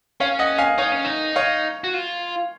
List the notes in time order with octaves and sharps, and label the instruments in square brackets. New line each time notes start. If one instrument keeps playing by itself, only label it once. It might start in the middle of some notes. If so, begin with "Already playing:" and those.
[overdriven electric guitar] C#4 [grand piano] C#5 F5
[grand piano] D#5 F#5
F5 G#5
[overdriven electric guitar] D#4 [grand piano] C#5 F5
[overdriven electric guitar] C#4
D#4
[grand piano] C#5 F5
[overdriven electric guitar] F#4
F4